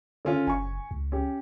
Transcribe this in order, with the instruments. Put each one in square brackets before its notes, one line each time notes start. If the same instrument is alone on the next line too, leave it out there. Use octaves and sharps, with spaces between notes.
[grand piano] D3 C#4 F4
[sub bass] F#1 [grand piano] G#5 C#6
[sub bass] C#2
[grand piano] C#4 G4